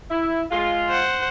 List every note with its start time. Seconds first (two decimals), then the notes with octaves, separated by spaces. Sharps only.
0.10 E4
0.51 G#3 F4
0.90 C5 F#5